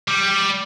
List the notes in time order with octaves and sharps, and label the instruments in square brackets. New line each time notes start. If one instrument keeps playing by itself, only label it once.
[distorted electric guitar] G3